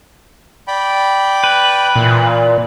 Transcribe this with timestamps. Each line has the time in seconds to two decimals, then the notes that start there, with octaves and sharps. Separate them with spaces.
0.67 D5 G5 B5
1.44 B4
1.96 A#2 E3